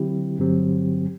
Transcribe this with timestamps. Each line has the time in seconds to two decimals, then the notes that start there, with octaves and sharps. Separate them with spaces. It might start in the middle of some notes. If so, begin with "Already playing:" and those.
Already playing: D3 F#3 C4 E4 G4
0.39 G2 D3 F#3 C4 G4